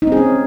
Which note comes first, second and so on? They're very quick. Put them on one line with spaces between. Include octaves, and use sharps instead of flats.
D#4 C4 G#4 C#4